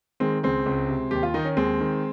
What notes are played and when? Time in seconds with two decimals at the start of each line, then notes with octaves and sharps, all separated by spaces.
0.20 D#3 G#3 C4
0.43 C#2 G#3 C4
0.66 C#2
0.89 C3
1.11 D#2 G4
1.23 F4
1.34 D#3 D#4
1.45 C#4
1.56 D#2 G#3 C4
1.80 D#3